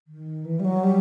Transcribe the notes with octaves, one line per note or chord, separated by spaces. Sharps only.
D#3
E3
G3
F#3
G3